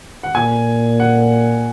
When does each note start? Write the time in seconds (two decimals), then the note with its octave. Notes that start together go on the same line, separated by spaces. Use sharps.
0.23 F#5
0.35 A#2 G#5
1.00 F#5